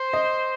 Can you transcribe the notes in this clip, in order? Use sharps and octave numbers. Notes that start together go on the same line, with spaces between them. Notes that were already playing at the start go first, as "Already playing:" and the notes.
Already playing: C5
D#5